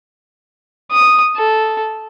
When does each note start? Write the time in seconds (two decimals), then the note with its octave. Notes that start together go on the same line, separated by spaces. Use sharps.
0.91 D#6
1.36 A4